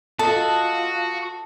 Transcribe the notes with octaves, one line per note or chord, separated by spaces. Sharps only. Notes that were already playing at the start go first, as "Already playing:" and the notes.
F4 F#4 A4 D#5 A5